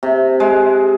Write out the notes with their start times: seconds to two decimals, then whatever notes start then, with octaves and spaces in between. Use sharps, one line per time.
0.03 C3
0.40 G#3